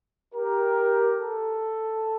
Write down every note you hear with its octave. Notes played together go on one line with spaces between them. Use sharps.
G4 A#4
A4